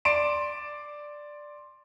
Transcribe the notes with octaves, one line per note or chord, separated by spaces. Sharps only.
D5 C6 D7 E7